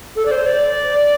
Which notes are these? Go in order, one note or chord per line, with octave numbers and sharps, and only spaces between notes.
A4
D5
C5
D5